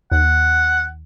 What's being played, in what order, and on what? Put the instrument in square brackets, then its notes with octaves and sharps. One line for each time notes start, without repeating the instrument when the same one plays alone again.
[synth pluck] D#2 [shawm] F#5